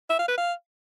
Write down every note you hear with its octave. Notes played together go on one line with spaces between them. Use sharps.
E5
F5
B4
F5